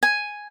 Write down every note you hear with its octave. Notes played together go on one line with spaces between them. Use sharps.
G#5